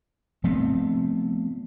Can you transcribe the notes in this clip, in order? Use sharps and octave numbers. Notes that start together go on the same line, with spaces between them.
F3 A3 B3 C4